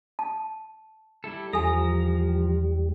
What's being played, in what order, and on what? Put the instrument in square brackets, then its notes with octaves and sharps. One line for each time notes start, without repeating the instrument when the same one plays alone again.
[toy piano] A5
[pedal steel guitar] G3 E4 A4
[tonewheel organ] E2 G3 [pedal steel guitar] F3 A#5 [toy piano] A4 G#5